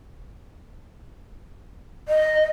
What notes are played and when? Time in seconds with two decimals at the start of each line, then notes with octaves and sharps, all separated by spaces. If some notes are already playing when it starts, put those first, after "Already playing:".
2.08 D#5